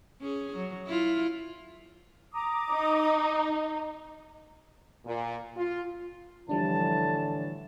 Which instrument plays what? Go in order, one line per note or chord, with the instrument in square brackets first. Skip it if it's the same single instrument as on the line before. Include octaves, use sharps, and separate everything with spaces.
[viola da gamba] C#4 G#4
F#3
E4 F4
[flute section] A#5 D6 D#6
[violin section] D#4
[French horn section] A#2
F4
[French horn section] A2 D3 E3 [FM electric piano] F3 G3 D4 [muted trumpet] A5